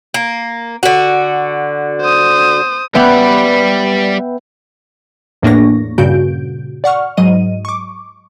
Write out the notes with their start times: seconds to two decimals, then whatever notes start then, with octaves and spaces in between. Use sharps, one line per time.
0.14 A#3
0.83 D3 F#4
2.01 C5 D#6
2.95 G3 B3 B4 D5 E5 G5
5.42 E2 A2 A#3 D4 C#6 A#6
5.98 G2 A#2 C#3 F#4 G6 D7
6.84 D5 F#5 C#6 F6
7.17 G#2 F#3 D#5 D#7
7.65 C#6 D6